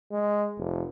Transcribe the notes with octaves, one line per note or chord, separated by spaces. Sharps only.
G#3
F1